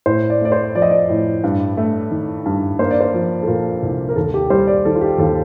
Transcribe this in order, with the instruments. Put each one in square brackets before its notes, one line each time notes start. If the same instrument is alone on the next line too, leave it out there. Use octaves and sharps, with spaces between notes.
[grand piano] A2 C5
D5
A3 D5
C5
F3 D5
D#5
D5
A2
G2
A3
D#3
G2
A#3 C5
D5
C5
F3
A4
A#2 A#4
C2
A#4
D#2 A4
G4
G3 C5
D5
D#3 A4
F4
G4
D#2 A4